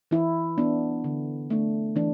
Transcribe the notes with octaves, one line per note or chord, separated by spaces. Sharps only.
E3 E4
B3 D4
D3
A3 D4
E3 D4